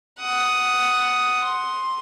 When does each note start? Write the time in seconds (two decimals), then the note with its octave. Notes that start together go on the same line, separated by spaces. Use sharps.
0.20 F#5 D#6
1.44 C6